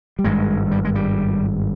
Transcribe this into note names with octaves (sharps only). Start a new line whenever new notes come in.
G3
G#1 G2 G#3
G3
G#3
G3